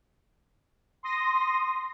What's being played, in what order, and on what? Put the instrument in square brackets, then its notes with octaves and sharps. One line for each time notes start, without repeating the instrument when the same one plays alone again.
[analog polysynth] C6 D#6 A#6